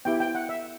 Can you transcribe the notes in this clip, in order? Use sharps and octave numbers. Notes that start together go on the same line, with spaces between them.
B3 E4 G4 G5
G5
F#5
E5